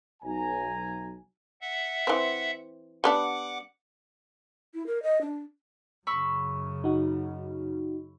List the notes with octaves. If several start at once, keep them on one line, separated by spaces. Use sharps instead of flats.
B1 G#5 A#5
E5 F#5
E3 C4
G3 B3 D4 F#5 D6
E4
A#4
D#5
D4
F#2 C#3 B5 C#6 E6
D#4 F#4